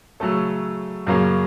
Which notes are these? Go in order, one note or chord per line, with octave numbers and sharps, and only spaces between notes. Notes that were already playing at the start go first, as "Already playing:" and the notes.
C#3 F#3 A3 C#4 A4
F#2 C#3 F#3 A#3 C#4